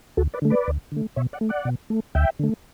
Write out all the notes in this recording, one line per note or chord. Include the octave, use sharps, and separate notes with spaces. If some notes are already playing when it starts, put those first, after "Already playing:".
D2 F#4 A4
B4 D5
D3 A3
B4 D5
D2
D3 A3
B2 C#5 E5
D5 F#5
A3
D5 F#5
B2
A3
D2 E5 G5
D3 A3